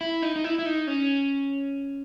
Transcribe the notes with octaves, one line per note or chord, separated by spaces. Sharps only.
E4
D#4
D#4
E4
E4
D#4
C#4